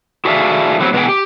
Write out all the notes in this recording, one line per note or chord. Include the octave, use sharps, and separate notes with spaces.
F#4 G#4 A4 D5 E5 F5
D3 F#3 G3 C4
B2 B3 D4 F#4 G#4 G5
G4